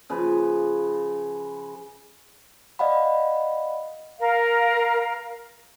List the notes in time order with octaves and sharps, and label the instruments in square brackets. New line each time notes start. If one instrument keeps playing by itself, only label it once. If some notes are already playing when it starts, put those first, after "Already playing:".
[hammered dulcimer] C#3 F3 B4
[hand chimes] D5 D#5 F5 F#5 B5
[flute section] A#4 F5